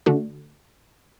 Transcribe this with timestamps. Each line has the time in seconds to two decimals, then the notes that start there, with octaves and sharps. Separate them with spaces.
0.06 D3 A3 D4 F#4